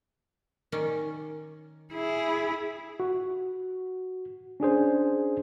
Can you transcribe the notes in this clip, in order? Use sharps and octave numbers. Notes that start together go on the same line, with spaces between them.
D#3 C#4 D5
E4 G#4
F#4
C#4 D4 G#4 C5